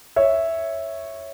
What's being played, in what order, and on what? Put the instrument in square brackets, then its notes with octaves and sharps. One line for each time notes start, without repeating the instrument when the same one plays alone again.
[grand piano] C#5 E5